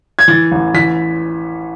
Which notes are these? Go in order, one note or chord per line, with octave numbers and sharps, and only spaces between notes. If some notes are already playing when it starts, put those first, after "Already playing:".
G#6
E3 A6
A1
E3 B6